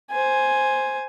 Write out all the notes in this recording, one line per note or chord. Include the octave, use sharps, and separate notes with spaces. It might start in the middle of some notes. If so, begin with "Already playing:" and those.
C5 G#5